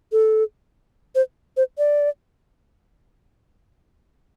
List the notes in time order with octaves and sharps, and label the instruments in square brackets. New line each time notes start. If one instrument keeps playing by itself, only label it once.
[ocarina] A4
C5
C5
D5